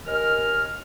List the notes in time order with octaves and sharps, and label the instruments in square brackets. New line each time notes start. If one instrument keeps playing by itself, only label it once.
[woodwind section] D#2 A#4 D#5 G#5 F6